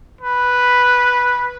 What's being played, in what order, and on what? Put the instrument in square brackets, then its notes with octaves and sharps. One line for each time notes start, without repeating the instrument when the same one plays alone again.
[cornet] B4